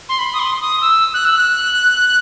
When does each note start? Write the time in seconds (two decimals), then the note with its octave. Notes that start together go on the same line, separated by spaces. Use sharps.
0.09 C6
0.19 B5
0.34 D#6
0.39 C6
0.61 D#6
0.81 E6
1.14 F#6
1.25 E6
1.36 F#6